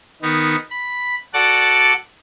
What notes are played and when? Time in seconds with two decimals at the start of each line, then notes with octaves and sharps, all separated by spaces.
0.22 D#3 B3 D#4
0.70 B5
1.34 F#4 A4 D5 F#5